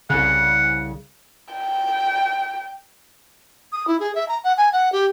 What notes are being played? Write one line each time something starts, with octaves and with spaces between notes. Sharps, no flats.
C2 C#3 F#5
G5
D#6
E4
G#4
E5
A#5
F#5
G#5
F#5
G4